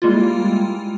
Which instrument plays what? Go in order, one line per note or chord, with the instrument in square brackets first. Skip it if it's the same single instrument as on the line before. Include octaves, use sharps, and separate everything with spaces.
[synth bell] G3 G#3 A#3 E4 F4